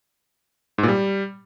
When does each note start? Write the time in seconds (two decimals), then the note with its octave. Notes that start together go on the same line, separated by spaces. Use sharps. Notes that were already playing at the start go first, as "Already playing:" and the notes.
0.78 G#2
0.83 A#2
0.88 G3